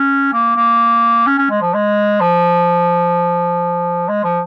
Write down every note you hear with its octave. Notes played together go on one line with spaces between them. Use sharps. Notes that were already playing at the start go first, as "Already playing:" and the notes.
Already playing: C#4
A#3
A#3
C#4
C#4
G#3
F3
G#3
F3
G#3
F3